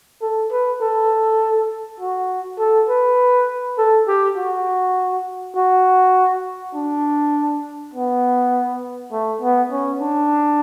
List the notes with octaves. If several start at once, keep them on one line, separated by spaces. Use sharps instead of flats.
A4
B4
A4
F#4
A4
B4
A4
G4
F#4
F#4
D4
B3
A3
B3
C#4
D4